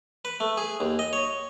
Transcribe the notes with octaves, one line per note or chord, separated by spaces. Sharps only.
B4
A3
G#4
D#2
D#5
C#5